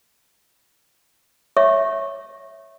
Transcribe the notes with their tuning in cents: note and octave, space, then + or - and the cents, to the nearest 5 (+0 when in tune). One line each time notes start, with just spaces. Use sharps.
C#5 +0 E5 +0 C#6 -25